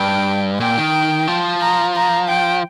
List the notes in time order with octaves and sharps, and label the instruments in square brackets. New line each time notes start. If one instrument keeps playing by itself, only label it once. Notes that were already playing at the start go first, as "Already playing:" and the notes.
Already playing: [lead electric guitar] G2 [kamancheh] G5
[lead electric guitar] A#2 [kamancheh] G5
[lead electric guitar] D#3
F3
[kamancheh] A#5
A#5
G5